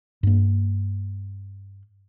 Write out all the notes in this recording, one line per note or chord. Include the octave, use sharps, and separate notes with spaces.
G2 A#3